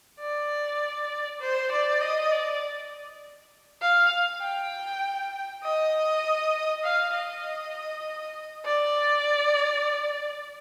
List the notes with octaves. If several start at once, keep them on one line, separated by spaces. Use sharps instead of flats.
D5
C5
D5
D#5
D5
F5
G5
D#5
F5
D#5
D5